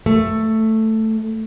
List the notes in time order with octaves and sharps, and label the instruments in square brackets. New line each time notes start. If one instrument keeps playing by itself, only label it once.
[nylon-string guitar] A3